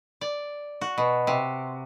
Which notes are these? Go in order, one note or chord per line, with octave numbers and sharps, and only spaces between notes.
D5
F#4
B2
C3